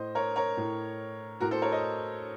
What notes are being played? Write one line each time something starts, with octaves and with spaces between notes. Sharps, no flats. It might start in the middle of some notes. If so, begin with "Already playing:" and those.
Already playing: A2 C5 D#5
A#4 C#5
A#4 C#5
A2
A2 F#4 A#4
A4 C5
A#4 C#5
C5 D#5